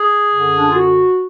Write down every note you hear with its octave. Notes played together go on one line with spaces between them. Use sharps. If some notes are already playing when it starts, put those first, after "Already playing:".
Already playing: G#4
F#2 D3
D4
F4
F#4